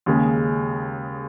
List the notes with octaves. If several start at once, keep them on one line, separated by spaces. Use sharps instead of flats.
D#2 C#3 G#3